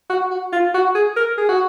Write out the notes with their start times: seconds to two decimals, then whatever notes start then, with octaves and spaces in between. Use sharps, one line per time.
0.10 F#4
0.31 F#4
0.53 F4
0.74 F#4
0.95 G#4
1.16 A#4
1.38 G#4
1.49 F#4